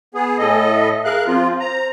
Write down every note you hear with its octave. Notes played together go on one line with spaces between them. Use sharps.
B3 G#4 G#5
A2 A4 D#5
E5
G#4 A#4 F5 F#6
F3 C4 F4
C5 A#5